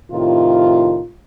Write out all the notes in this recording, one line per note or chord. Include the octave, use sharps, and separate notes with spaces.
A2 C3 D#3 F4